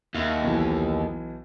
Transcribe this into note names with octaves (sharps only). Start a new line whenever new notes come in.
D#2 E5
B1 E3